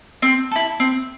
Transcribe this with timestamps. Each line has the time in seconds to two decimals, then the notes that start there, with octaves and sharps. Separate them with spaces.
0.22 C4
0.51 E4 A4
0.80 C4